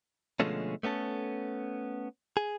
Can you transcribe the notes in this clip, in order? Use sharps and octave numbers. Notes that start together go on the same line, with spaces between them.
B2 D3 F3 G#3 A3 C#4
A3 B3 C#4 A4
G#4